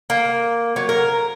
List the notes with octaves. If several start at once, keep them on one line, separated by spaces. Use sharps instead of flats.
A#3
F#3
A#4